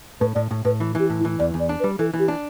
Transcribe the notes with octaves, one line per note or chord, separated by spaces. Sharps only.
A2 B4
A2 D5
A2
A2 B4
E3
E3 G4
A2
E4
E3
E2 D5
E2
D5
D4
B4
G3
E3 A4
E3
G4
D4